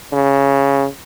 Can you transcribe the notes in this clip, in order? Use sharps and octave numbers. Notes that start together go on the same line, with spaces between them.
C#3